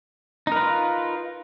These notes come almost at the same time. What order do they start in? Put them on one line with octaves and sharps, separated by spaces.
D#4 A#4 B4 F4